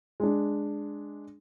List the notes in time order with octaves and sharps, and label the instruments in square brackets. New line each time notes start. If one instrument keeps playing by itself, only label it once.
[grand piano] G#3 D4